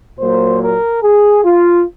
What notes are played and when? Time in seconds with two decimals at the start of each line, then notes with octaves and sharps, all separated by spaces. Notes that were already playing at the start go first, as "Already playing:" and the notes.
0.19 A#2 F#3 A#3 C5
0.60 A#4
1.02 G#4
1.44 F4